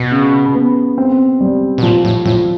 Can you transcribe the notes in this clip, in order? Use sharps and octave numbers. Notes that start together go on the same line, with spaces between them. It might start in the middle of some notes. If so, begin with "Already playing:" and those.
Already playing: B2
C#3
B3
C4
G3
B2
A#2 F3
A2
A2 F3